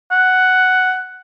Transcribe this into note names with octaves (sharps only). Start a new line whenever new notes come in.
F#5